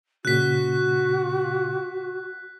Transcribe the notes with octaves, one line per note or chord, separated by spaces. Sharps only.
A#2 C#3 F#4 F#6 B6